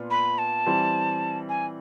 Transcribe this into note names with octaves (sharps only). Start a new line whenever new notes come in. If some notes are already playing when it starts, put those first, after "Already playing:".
Already playing: A#2 B3 D4 F4
B5
A5
E3 G3 C4
G#5